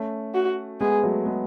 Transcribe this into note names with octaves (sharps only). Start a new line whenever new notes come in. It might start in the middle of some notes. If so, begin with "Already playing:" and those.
Already playing: A3 C#4
F#4
G#3 B3 G#4
F#3 A3
G#3 B3